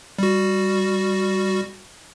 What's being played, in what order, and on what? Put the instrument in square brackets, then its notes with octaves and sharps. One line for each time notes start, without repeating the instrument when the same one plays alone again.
[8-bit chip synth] G3 F#4